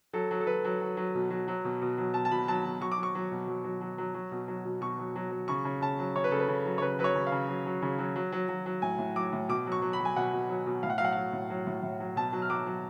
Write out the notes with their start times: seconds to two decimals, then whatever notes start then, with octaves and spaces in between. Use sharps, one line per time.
0.13 F#3 A4
0.31 F#3
0.41 A4
0.47 F#3 B4
0.65 F#3
0.81 F#3
0.97 F#3
1.15 B2
1.30 F#3
1.48 F#3
1.64 B2
1.82 B2
1.98 F#3
2.14 B2 A5
2.25 A5
2.31 B2 B5
2.48 F#3 A5
2.65 B2
2.81 F#3 C#6
2.92 D6
2.98 F#3
3.03 C#6
3.15 F#3
3.32 B2
3.48 F#3
3.64 F#3
3.81 F#3
3.98 F#3
4.14 F#3
4.32 B2
4.48 F#3
4.65 B2
4.81 B2 C#6
4.98 F#3
5.16 F#3
5.31 F#3
5.48 C#3 C#6
5.65 C#3
5.82 C#3 A5
5.99 F#3
6.15 C#3 C#5
6.24 B4
6.31 C#3 A4
6.39 B4
6.48 C#3
6.66 F#3
6.78 C#5
6.81 C#3 B4
6.99 F#3 B4
7.04 C#5
7.15 C#3
7.27 F5
7.32 C#3
7.48 F#3
7.66 F#3
7.82 C#3
7.99 F#3
8.16 F#3
8.33 F#3
8.49 F#3
8.66 F#3
8.82 A2 G#5
8.99 A2
9.16 F#3 D6
9.33 A2
9.49 B2 D6
9.67 F#3
9.72 C#6
9.82 F#3
9.93 B5
10.00 F#3
10.05 G#5
10.16 B2 F#5
10.33 B2
10.49 F#3
10.66 B2
10.83 A2 F5
10.90 F#5
10.98 F#3 F5
11.05 F#5
11.13 F#3 F5
11.33 A2
11.50 F#3
11.67 A2
11.83 A2
12.00 F#3
12.16 B2 A5
12.33 F#3
12.42 F6
12.50 F#3 D6
12.67 F#3